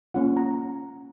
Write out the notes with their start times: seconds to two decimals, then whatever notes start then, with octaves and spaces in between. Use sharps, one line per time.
0.14 A#3 C#4 F4 F#5
0.37 A#5